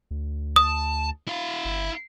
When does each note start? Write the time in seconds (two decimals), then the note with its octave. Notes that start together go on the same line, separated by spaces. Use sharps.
0.11 D2
0.56 A5 D#6
1.27 E4 F5
1.65 G1